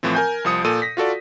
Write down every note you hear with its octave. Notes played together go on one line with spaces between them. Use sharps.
A2 E3 F3 C4
A#4 G#5 G6
C2 F3 D#6 C#7
A#2 A4 D#6 D#7
A#6 B6
F4 F#4 A4 D5